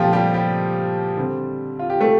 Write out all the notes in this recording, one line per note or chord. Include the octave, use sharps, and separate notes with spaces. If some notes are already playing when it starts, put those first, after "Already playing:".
Already playing: A#2 F3 A3 C4 F4 G4
G3 G4
G3 G4
D3 G3 C4
F4
G4
A3 A4